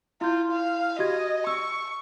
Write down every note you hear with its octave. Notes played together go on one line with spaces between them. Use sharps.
E4 F4 G6
F5
F#4 G4 D#5 G#6
C#6 E6